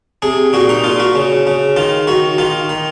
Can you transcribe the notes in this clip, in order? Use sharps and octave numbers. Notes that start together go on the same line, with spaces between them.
C3 G#4
A#2 F#4
D#4
A#2 F4
F#4
C#3
C#3
D#3 F4
D#3 F#4
D#3 F4
D#3